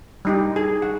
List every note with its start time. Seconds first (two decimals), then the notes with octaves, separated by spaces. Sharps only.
0.25 G3 D#4 G4
0.56 G#4
0.82 F#5